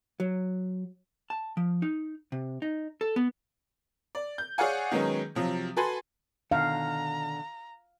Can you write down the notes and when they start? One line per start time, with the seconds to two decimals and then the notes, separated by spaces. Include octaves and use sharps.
0.20 F#3
1.30 A5
1.57 F3
1.82 D#4
2.32 C3
2.62 D#4
3.01 A4
3.16 B3
4.15 D5
4.38 G6
4.58 G#4 C#5 D5 F5 F#5 G#5
4.91 D#3 F#3 G#3 B3 C#4 D#4
5.35 C3 F3 F#3
5.76 F#4 A4 B4 G#5 B5 C6
6.52 B2 D3 D#3 F5 A#5